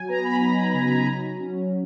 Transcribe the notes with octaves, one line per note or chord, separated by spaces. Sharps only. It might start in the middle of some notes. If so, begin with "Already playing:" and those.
Already playing: F#3 G#5
B3 A#5
B5
D#4
C#3
F#3
C#4